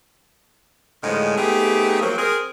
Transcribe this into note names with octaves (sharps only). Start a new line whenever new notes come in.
A2 D3 D#3 F3 G#3
A3 B3 C4 D#4 G4 G#4
F3 F#3 A#3
C4 G#4 A#4